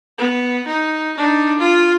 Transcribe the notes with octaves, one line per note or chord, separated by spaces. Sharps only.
B3
D#4
D4 D#4
F4